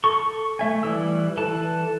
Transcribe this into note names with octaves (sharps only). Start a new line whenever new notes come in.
A4 C#6
A3 E5 G#5
E3 G3 E6
E3 A4 B4 A5